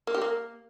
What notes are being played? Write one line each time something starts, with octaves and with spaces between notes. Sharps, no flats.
A#3
G4
A#3